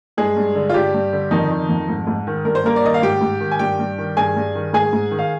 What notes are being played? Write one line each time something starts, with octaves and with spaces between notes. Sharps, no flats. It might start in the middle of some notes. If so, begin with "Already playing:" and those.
G2 G#3 G#4
G2
D3
F4
G2 G3 G4
G2
D3
F2 D#3 D#4
D#3
F2
G#2
G#2
D#3
G2 A#4
C5
G2 A#3 A#4
D5
D#3 D#5
F5
G#2 G4 G5
G#2
D#3
G#5
G2 G4 G5
G2
D#3
G2 G#4 G#5
G2
D#3
G#2 G#4 G#5
G#2
D#3
F5